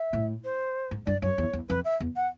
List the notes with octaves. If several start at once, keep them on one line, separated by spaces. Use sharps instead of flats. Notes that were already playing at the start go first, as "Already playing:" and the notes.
Already playing: E5
A2
C5
G#2
G2 D5
F#2 C#5
E2
E2
F2 B4
E5
E2
F#5